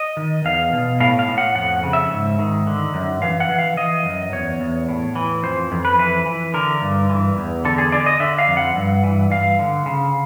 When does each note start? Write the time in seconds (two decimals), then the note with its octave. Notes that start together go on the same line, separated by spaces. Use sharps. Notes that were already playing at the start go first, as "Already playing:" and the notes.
Already playing: D#5
0.17 D#3
0.45 E2 F5
0.73 B2
1.00 A2 F5
1.19 F5
1.28 A2
1.38 F#5
1.55 F2 F#5
1.83 C#3
1.93 E5
2.11 G#2
2.39 D#3
2.67 D3
2.94 F#2
3.22 E3 F5
3.40 F#5
3.49 E3
3.58 F5
3.77 E3 D#5
4.05 F#2
4.32 E2 C#5
4.60 E2
4.89 A2
5.16 E3
5.43 F2 C5
5.72 F2
5.85 B4
5.99 E3 B4
6.26 E3
6.54 D3 A#4
6.82 G2
7.10 E3
7.37 E2
7.65 D3 A4
7.78 G#4
7.92 D3 D5
8.06 D#5
8.20 D3 E5
8.38 F5
8.48 F2
8.57 F#5
8.75 G2
9.03 E3
9.30 G2 F5
9.59 D3
9.86 C#3